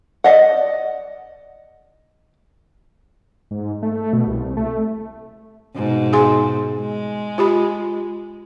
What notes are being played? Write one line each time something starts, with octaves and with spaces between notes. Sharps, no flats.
D5 D#5 F#5
G#2
A3
B2
C2
A3
G#2 B2
G#4 G#5 C6
G#3
F4 G4 B5